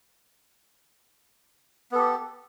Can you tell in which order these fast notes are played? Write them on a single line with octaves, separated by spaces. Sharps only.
B3 A4 G4